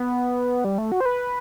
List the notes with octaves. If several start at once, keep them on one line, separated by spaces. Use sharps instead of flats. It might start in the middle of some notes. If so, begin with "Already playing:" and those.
Already playing: B3
G3
A3
F#4
C5
B4